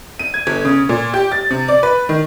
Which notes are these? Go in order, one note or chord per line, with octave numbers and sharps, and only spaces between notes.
D#7
G#6
G1
C#3
A#2
G4
A6
C3
D5
B4
D#3